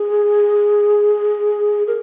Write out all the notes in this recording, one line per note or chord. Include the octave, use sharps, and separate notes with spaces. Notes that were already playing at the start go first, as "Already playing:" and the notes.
Already playing: G#4
A#4